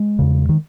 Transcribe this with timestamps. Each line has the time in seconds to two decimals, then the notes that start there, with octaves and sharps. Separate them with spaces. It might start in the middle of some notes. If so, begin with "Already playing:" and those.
Already playing: G#3
0.19 E2 C#3
0.49 D#3